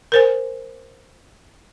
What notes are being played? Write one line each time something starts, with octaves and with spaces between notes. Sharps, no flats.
A#4 C5 G#5